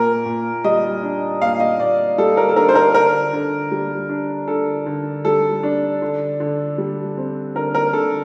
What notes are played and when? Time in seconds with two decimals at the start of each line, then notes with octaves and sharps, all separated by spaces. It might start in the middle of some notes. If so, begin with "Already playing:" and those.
Already playing: A#2 A#4
0.26 A#2
0.64 G3 D#5
1.03 D4
1.42 A#2 F5
1.60 D#5
1.80 A#2 D5
2.18 G3 A4
2.37 A#4
2.49 A4
2.56 D4 A#4
2.69 C5
2.75 A#4
2.94 D3 A#4
3.33 D3
3.71 G3
4.09 D4
4.48 D3 A4
4.86 D3
5.25 G3 A4
5.63 D4
6.02 D3
6.40 D3
6.78 G3
7.17 C4
7.55 D3 A#4
7.75 A#4
7.93 D3 A4